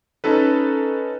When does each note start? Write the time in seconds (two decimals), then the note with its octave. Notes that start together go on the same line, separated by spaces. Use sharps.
0.24 C#4 D#4 A4 B4